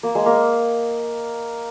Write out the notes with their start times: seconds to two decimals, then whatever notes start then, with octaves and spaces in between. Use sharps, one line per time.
0.03 A#3
0.15 G#3
0.26 A#3